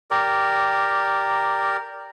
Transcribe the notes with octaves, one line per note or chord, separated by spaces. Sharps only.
G4 A#4 D5